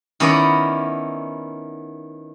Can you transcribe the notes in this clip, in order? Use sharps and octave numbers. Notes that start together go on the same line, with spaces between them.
D#3 B3 C#4 E4 D5 D#5